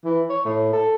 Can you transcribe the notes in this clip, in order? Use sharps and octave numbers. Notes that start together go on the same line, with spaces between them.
E3
C#5
A2
A4